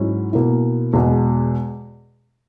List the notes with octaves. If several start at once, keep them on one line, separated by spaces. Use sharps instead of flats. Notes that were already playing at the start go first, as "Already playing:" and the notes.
Already playing: G#2 F#3 C#4 E4
B2 A#3 E4
E2 B2 G#3